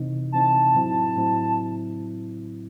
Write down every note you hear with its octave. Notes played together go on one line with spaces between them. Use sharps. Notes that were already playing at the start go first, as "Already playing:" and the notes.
Already playing: C3 E3 C4 D#4
C3 E3 C4 D#4 A5
A2 F#3 C4 E4
A2 F#3 C4 E4